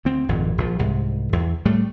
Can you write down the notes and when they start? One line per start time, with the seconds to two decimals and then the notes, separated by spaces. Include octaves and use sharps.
0.05 D2 C4
0.29 G#1 F2 A#2
0.58 A#1 F3
0.79 C2 G#2
1.33 E2
1.65 A2 G3 A3